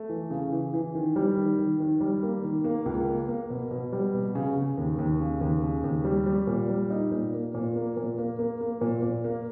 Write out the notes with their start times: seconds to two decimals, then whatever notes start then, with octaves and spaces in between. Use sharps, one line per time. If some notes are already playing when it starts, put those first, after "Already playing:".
Already playing: A3
0.09 E3
0.30 C#3
0.53 E3
0.74 E3
0.95 D#3
1.16 G3
1.37 D#3
1.59 D#3
1.80 D#3
2.01 G3
2.22 A#3
2.44 D#3
2.64 A#3
2.86 C#2
3.08 A#3
3.28 A#3
3.50 B2
3.71 B2
3.92 G3
4.14 B2
4.35 C#3
4.56 C#3
4.77 D#2
4.98 D#2
5.20 C#3
5.41 D#2
5.63 C#3
5.84 D#2
6.05 G3
6.26 G3
6.47 A#2
6.69 G3
6.90 D#4
7.12 A#2
7.33 A#3
7.54 A#2
7.76 A#3
7.97 A#2
8.18 A#3
8.39 A#3
8.61 A#3
8.81 A#2
9.02 A#2
9.24 A#3